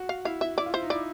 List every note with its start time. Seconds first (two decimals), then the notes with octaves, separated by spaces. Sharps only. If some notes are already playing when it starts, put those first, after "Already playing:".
Already playing: F#4
0.09 F5
0.25 E4 F5
0.41 E4 E5
0.58 E4 D5
0.66 F4
0.74 E4 C5
0.83 D#4
0.90 E4 D5